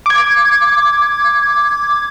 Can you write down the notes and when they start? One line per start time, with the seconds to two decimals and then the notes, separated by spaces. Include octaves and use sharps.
0.06 D6 G#6